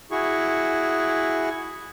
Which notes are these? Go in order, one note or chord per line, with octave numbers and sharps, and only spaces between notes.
E4 F#4 G#4 C#6